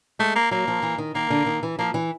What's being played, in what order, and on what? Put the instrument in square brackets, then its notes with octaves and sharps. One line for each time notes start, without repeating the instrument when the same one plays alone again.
[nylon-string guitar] G#3 [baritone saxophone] A3
[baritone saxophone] A#3
[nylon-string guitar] F#3 [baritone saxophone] A#3
[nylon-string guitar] F3
E3
D#3
[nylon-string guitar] D#3 [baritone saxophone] A#3
[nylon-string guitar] D3
D#3
E3
[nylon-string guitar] F3 [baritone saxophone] A#3
[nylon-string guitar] E3